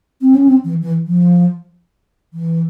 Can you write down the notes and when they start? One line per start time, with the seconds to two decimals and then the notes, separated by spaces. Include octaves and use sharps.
0.22 C4
0.35 C#4
0.48 C4
0.64 E3
0.82 E3
1.06 F3
2.33 E3